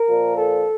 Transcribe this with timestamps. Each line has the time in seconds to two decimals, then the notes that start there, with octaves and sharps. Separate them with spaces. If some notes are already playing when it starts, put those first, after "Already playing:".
Already playing: A#4
0.08 A#2 F3
0.37 A4